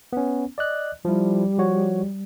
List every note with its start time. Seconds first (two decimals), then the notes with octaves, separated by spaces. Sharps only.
0.13 B3 C#4
0.58 D5 D#5 F#6
1.05 F3 G3 E4
1.58 F3 F#4 C#5